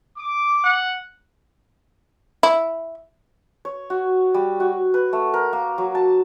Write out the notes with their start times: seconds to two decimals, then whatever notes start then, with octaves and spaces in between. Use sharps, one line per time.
0.18 D6
0.64 F#5
2.43 E4
3.65 C#5
3.90 F#4
4.34 G3
4.60 F#4
4.94 B4
5.13 A3
5.34 A#4
5.53 A#3
5.78 F#3
5.95 A5